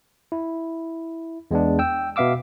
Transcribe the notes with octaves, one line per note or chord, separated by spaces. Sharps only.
E4
E2 G#3 B3 D4
G5 E6
B2 B3 E5 F5 D6 E6